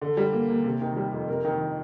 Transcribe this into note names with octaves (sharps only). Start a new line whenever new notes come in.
D3
G3
A#3
D#2
C3
D#3
G3
F2
C3 A#4
D#3